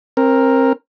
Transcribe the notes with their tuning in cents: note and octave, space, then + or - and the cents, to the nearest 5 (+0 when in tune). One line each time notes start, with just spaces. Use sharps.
C4 +25 A#4 +0